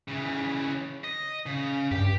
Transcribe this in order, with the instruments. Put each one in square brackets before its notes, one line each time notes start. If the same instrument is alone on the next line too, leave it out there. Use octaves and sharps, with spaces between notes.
[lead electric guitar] C#3 E3
D#5
C#3
[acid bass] G2 [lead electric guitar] G4